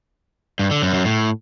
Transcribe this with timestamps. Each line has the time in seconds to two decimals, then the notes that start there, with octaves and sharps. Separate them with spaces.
0.59 G2
0.71 D3
0.82 F#2
0.94 F#2
1.05 A2